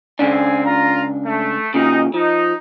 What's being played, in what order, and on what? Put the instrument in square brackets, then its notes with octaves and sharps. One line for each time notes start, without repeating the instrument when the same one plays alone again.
[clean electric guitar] C#2 C#3 D4 [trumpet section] C4 G#5
[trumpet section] F4 A#5
A3
[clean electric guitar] A#2 C#3 [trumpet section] D#4
[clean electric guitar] F3 [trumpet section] D#4